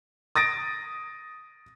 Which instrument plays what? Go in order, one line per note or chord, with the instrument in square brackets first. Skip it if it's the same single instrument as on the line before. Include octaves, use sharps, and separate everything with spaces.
[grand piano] D#6 A6 A#6 D7